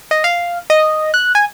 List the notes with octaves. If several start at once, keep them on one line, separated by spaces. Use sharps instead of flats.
D#5
F5
D#5
F#6
G#5